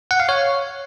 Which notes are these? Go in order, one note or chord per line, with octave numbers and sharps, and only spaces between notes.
F#5
F5
C#5